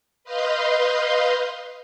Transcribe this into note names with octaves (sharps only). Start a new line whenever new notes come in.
B4 D#5 F5 C6 G6